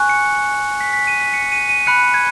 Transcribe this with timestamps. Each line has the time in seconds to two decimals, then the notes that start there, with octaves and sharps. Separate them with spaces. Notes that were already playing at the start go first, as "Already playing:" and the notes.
Already playing: G#5 C#6 F#6
0.09 C#7
0.81 B6
0.93 B6
1.07 D#7
1.21 B6
1.34 C#7
1.52 D#7
1.69 D#7
1.87 B5 F#6 C#7
2.14 G#6